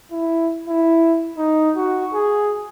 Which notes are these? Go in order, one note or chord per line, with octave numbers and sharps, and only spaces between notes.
E4
E4
D#4
F#4
G#4